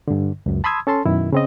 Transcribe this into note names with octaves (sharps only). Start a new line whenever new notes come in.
G2 D3
C#2 F#2
A5 B5 C6 D#6 E6 G#6
C#4 A4 A5 C6
F#2 B2 D#3 E4
C#3 C4 D#5